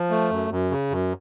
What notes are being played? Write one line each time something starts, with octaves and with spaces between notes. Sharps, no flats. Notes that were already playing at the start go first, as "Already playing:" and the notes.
Already playing: F3
A3
F#2
F#2
C#3
F#2